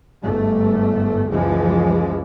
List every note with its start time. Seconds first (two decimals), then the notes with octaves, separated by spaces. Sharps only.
0.21 G1 G#2 A3
1.31 F#1 C#2 E3 F3 G#3